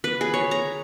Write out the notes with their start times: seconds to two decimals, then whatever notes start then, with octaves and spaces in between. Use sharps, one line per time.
0.04 B4
0.21 G#4
0.34 C#5
0.51 A#5